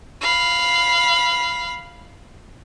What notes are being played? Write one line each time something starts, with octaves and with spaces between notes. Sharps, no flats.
F5 B5